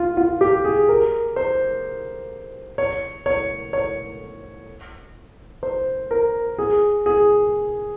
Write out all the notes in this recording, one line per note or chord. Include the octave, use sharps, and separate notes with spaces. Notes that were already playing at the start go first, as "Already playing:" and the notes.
Already playing: F4
F4
G4
G#4
A#4
C5
C#5
C#5
C#5
C5
A#4
G#4
G#4